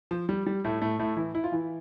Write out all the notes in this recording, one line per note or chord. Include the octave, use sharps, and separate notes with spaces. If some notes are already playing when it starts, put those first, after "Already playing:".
F3
G3
G3
A2 A3
A2 A3
A2 A3
E3 E4
E4
F4
E3 E4